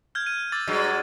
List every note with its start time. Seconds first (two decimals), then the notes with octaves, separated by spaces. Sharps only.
0.15 F6 G6 G#6
0.26 F6 D#7
0.52 D6 E6 A6
0.67 G2 F#3 G#3